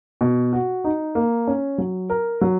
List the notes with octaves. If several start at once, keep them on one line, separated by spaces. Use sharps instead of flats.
B2
F#4
D#4
A#3
C#4
F#3
A#4
F#3